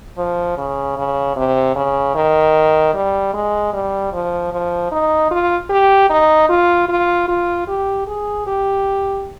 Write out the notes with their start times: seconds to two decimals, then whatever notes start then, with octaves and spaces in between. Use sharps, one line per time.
0.18 F3
0.57 C#3
0.97 C#3
1.36 C3
1.76 C#3
2.15 D#3
2.94 G3
3.34 G#3
3.73 G3
4.13 F3
4.52 F3
4.92 D#4
5.31 F4
5.70 G4
6.10 D#4
6.50 F4
6.89 F4
7.28 F4
7.68 G4
8.07 G#4
8.47 G4